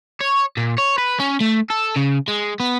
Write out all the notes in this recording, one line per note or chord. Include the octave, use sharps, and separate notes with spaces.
C#5
A#2
C#5
B4
C#4
A3
A4
C#3
G#3
B3